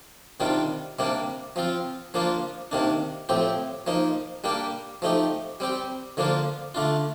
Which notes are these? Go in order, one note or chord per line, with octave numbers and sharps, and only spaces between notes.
C3 D#3 G3 D4 F4
C3 G3 A#3 D4
F3 C4 F4
F3 A#3 D4 F4
C3 D#3 A#3 D4
A2 F3 C4 G4
F3 A#3 D#4
G3 A#3 D4 G4
F3 A3 D#4 G4
G3 C4 G4
D3 F3 A#3 D4 F4
D3 A3 D4 F4